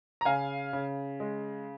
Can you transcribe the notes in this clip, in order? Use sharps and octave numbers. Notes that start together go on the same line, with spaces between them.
A#5
C#3 F5 G#5
C#3
G#3